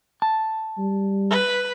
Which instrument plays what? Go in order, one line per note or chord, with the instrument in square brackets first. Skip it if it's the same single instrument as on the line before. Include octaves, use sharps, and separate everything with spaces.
[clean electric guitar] A5
[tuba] G3
[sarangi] B4